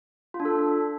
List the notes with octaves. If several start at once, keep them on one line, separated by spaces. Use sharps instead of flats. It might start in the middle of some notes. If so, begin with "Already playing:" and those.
F4
D4
A4